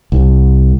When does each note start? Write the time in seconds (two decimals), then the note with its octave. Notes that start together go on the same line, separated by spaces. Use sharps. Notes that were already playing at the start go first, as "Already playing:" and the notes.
0.12 C2